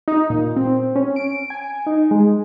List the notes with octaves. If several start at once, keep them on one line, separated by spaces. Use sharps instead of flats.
D#4
A#2
C4
C#4
D7
G#5
D#4
G#3